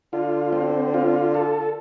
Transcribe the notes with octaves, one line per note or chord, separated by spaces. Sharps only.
D3 F4
C4
F4
A4